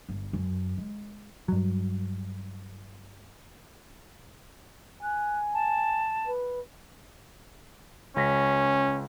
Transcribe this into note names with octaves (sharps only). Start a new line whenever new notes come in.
G1
F#2
G#3
G2 F#3
G#5 F#6
A5
B4
C#2 C#4 A#6 B6